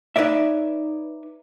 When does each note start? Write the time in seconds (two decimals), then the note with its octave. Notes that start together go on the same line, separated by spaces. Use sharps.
0.16 D#4 B4 C#5 D5 E5